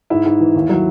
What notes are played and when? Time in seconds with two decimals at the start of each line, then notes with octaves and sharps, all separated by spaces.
0.10 G#2 E4
0.26 G#2
0.40 E3
0.55 D#2
0.69 F#3